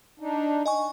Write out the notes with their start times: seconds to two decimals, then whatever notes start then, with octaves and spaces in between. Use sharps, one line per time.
0.20 D4 D#4
0.66 D#5 G#5 C#6